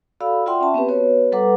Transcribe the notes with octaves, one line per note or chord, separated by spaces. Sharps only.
F#4 A4 D5 F5 B5 E6
F4 D5 E5 F#5 G5 C6
C#4 E5 A5
B3 C4 G4 B4
B3 F#4 B4 C#5
G3 A4 B4 F#5 A#5 D6